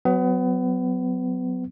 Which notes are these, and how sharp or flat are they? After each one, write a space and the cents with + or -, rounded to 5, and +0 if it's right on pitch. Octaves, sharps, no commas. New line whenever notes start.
F#3 +0 B3 +30